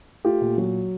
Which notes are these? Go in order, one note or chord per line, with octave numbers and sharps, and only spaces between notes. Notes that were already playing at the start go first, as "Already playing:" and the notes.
A3 F4 G4
A#2
F#3